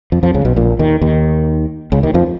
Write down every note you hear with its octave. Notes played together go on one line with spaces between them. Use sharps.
F2 F3
F2 F3
C#2 C#3
B1 B2
A#1 A#2
D#2 D#3
D#2 D#3
C#2 C#3
D#2 D#3
F2 F3